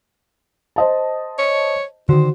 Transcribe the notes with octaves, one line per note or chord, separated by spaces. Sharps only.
C5 D#5 A5
C#5
D3 D#3 F#4 C5